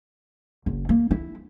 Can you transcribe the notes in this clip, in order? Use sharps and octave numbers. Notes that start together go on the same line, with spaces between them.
F#1
A#3
E4